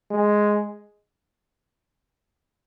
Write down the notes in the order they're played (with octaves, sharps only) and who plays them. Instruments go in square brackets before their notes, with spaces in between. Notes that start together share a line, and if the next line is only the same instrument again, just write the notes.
[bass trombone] G#3